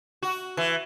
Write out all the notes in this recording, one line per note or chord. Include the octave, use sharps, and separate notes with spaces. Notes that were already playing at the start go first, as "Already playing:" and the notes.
F#4
E3